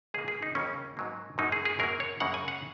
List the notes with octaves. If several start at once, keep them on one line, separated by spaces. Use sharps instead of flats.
C#2 C#3 A#3 G#4
G#4
D#4
D#2 C#3 F#3 A#3 C#4
G#2 F#3 A#3
F#2 F#3 A#3 D#4
G#4
G#4
F#2 F#3 A#3 A#4
C#5
F#2 C#3 A#3 F#5
G#5
F#5